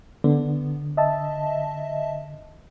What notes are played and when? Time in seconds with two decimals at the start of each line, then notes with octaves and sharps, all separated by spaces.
0.24 D3 B3
0.97 D#5 E5 A5